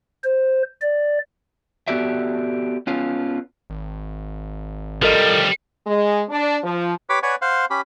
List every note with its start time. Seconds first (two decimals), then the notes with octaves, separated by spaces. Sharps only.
0.24 C5
0.81 D5
1.88 B3 F#4 G4 A4 D5 E5
2.87 B3 C#4 F4
3.70 G#1
5.02 F3 G3 A4 A#4 D#5
5.86 G#3
6.28 D4
6.63 F3
7.09 G4 B4 C#5 B5 D6
7.23 B4 C#5 D5 F#5 G#5
7.42 C5 F5 F#5 C6
7.70 C#4 G4 B5